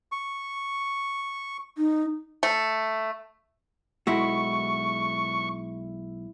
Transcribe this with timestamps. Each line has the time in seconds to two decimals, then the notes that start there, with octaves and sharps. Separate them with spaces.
0.12 C#6
1.78 D#4
2.43 A3
4.07 B1 G#3 E4 F#4 C#6